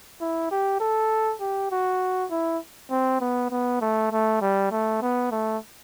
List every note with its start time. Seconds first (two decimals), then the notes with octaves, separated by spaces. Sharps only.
0.21 E4
0.51 G4
0.80 A4
1.41 G4
1.71 F#4
2.31 E4
2.91 C4
3.21 B3
3.51 B3
3.81 A3
4.12 A3
4.41 G3
4.71 A3
5.02 B3
5.32 A3